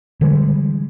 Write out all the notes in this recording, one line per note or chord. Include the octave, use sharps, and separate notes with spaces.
D3 E3 G3 G#3